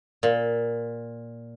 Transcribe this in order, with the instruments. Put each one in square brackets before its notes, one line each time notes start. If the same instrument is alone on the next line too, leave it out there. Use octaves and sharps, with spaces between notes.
[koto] A#2